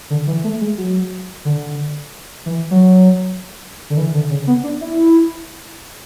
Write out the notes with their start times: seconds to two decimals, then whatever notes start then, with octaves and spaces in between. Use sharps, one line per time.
0.10 D3
0.27 E3
0.44 A3
0.61 G#3
0.78 F#3
1.45 D3
2.46 E3
2.71 F#3
3.90 D3
3.97 E3
4.14 D3
4.30 C#3
4.47 B3
4.64 D4
4.81 E4